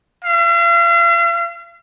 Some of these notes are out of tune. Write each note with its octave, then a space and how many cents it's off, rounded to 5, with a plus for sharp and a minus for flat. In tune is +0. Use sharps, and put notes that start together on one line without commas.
F5 -45